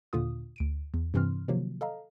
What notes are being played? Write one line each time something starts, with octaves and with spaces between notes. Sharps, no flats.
D#2 A#2 D3 F4 D#6
D2 D7 D#7
E2
G2 C3 E3 C4 C6 F6
C3 D#3 F3 F#3 A#3
A4 D#5 F5 A#5